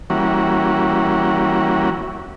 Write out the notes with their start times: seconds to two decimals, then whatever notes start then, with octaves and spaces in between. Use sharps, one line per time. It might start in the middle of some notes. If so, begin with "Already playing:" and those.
0.10 E3 G3 A#3 C#4 F#4